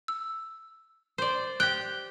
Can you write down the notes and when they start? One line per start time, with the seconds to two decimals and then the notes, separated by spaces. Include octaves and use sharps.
0.08 E6
1.18 C5 D5
1.60 G4 G5 F#6